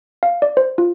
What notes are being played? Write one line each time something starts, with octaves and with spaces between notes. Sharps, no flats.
F5
D5
C5
F4